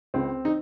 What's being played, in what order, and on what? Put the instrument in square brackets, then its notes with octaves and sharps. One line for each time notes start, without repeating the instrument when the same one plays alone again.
[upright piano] C#2 C4
D#4